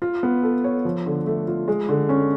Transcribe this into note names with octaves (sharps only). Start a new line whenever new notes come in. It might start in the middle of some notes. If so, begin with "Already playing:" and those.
F4
B3
A4
C#5
F3
D3
A3
F4
G#3
D3
C#4